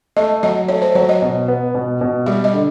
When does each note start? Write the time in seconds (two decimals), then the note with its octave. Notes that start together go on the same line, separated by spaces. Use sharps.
0.16 A3 D#5
0.43 F#3 D#5
0.68 A3 C#5
0.82 C5
0.95 F#3 C#5
1.09 D#5
1.22 B2
1.48 B3
1.75 B2
2.01 B2
2.26 G3 E5
2.44 D#5
2.53 D3